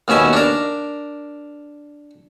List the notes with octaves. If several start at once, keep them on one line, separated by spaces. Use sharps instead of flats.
D#2 B2 C#4 E5 G#5
D4 A#4